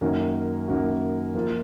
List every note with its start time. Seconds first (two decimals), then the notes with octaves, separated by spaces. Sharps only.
0.01 F#2 D#3 A#3 C#4 F#4
0.68 F#2 D#3 A#3 C#4 F#4
1.34 F3 A#3 F4 A#4